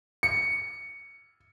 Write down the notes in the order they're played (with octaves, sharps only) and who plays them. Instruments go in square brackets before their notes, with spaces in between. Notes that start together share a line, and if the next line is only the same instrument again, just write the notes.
[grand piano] C#7